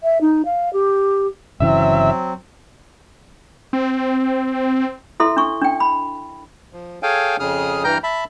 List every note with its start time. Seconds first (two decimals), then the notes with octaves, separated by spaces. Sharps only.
0.03 E5
0.21 D#4
0.45 F5
0.73 G4
1.60 G1 C#3 E3 F#3 C4 E5
3.73 C4
5.20 E4 A4 E5 C6
5.37 D4 C#6
5.62 D4 G5
5.80 B5
6.73 F3
7.03 G#4 A4 C#5 F5 G5 G#5
7.40 F2 C#3 G#4 D#6 F6
7.84 G2 E3 G5 A#5 F6 G6
8.03 E5 A5 B5